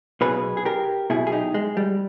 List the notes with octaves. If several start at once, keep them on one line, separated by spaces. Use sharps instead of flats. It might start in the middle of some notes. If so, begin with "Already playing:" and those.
B1 B2 G#4 B4
G#4
G4 A#4
B1 B2 E4 G#4
G#4
D#4 G4
G#3
G3